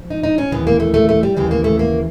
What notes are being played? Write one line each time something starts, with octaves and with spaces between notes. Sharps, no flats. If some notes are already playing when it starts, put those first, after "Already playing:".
Already playing: G#2 F3
D#4
D#4
C#4
D#2 C#3 E3 B3
A#3
A3
A3
A3
G3
D#2 C#3 E3 G3
A#3
A3
A#3